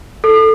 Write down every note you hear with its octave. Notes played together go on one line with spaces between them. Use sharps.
A4